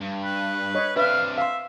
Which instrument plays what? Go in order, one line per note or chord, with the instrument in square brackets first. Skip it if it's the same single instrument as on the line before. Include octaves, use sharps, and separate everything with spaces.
[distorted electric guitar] G2
[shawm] B4
[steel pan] C#5 D#5
[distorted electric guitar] C3 D4 [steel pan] B4 E5 [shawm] F5
[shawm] E5 [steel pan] F5 C6